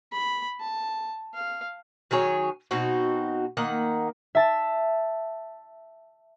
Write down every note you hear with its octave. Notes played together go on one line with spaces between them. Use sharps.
B5
A5
F5
D#3 F#3 G#4 C#5
B2 C4 D#4 F#4
D#3 A#3 D#4 F#5
E5 A5